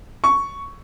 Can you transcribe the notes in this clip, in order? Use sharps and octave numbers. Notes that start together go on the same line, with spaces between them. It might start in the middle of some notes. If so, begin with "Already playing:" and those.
C#6